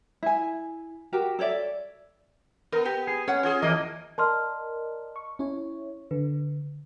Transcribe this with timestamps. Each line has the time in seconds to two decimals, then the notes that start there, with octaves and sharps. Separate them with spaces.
0.23 E4 G#5
1.13 F#4 G4 A#4
1.39 A4 C#5 D5 E5
2.72 B3 A#4
2.85 G4
3.07 G#4
3.28 C#4 C#5 F#5
3.43 F4 G#4
3.62 F2 E3 A#3 D#5
4.18 A#4 D5 D#5 A5 C6 F6
5.16 C#6
5.39 C#4 E4 C#5
6.11 D3 B4